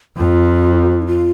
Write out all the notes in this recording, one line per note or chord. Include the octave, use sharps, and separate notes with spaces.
F2 F4
E4
F4